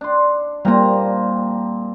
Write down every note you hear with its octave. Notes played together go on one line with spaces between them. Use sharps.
D4 C6
A#2 G3 A#3 C4 A#5